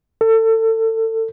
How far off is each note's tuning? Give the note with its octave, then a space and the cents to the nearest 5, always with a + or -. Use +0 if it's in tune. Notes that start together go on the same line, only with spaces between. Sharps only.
A4 +30